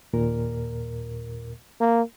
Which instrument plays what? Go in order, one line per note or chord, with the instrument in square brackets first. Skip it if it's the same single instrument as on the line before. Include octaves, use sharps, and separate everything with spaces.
[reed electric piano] D#2 A#2 A#4
[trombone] A#3